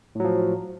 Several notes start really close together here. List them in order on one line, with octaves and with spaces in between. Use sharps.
A2 F#3 F3